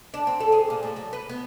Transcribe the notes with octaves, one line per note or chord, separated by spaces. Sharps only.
D4
C4
A4
G#4
A#2
A2
F#3
B4
B3